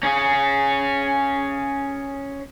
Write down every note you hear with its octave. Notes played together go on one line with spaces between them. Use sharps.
C#4 G#4